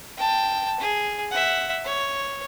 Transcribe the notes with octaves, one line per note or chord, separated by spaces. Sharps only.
G5 A5
G#4
E5 F#5
C#5